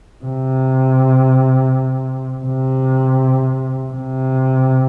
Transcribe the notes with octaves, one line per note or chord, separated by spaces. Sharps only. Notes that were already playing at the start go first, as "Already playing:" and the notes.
C3
C3
C3